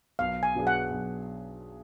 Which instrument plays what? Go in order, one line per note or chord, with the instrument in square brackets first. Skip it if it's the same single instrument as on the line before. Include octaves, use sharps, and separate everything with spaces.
[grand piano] B1 [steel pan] F5
[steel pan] G#5
[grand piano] B2 F#3 D4 G#4
[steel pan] F#5
[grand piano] B1